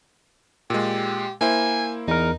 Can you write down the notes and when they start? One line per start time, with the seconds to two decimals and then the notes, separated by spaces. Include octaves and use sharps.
0.70 A#2 G#3 G4
1.41 A#3 E4 C5 G#5
2.08 E2 D#4 A#4